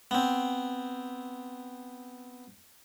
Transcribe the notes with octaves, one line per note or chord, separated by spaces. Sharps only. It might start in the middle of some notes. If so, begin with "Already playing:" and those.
B3 C4